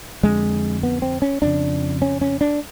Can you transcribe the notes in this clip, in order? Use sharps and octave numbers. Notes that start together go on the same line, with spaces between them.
F2 D3 G#3
B3
C4
C#4
F2 C#3 D4
C#4
C#4
D4